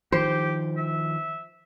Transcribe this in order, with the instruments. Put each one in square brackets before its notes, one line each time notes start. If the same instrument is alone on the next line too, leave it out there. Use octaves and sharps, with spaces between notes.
[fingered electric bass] D#3 F3 [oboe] G4 [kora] C5
[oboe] E5